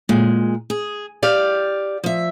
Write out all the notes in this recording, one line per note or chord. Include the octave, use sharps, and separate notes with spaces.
A#2 G#3
G#4
G4 D5 F5
F3 E5